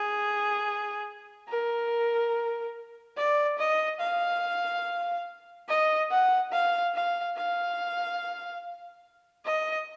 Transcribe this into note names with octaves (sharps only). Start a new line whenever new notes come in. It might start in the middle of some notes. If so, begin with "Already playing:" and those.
Already playing: G#4
A#4
D5
D#5
F5
D#5
F#5
F5
F5
F5
D#5